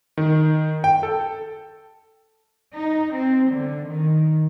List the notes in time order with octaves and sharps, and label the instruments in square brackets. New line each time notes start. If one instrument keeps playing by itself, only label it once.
[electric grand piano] D#3
G5
A4
[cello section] D#4
C4
D3
D#3